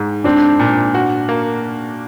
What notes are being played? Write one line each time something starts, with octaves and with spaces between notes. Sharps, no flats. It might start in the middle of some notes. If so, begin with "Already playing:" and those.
Already playing: G#2
C4 D4
A#2
F#4
A#3